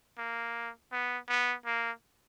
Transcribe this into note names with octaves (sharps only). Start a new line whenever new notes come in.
A#3
B3
B3
A#3